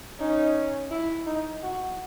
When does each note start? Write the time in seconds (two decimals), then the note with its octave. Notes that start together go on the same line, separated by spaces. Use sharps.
0.20 C#4 D#4
0.91 E4
1.26 D#4
1.62 F#4